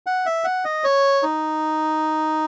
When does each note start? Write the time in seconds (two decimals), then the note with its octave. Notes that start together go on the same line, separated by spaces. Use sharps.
0.06 F#5
0.26 E5
0.44 F#5
0.65 D#5
0.84 C#5
1.23 D#4